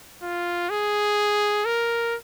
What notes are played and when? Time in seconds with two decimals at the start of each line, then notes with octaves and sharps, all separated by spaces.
0.22 F4
0.70 G#4
1.65 A#4